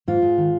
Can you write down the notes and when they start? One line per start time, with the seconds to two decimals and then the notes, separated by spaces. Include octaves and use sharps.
0.08 G#2 F4
0.22 G#2
0.38 D#3